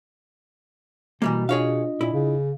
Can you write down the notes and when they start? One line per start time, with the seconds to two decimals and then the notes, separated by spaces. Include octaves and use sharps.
1.22 B2 E3 G3 A#3
1.49 D4 F4 G#4 C#5 D#5 F5
2.01 A#2 E4
2.13 C#3